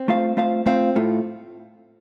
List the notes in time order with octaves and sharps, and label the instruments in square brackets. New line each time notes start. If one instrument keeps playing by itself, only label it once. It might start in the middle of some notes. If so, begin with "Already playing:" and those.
Already playing: [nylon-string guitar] C4
[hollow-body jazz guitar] A3 F4 C5 F5
A3 F4 C5 F5
[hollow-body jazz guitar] A3 F4 C5 F5 [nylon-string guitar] C4
[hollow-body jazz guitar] A2 A3 F4